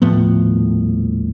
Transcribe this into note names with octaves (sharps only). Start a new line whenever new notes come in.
D#1 A2 F3 B3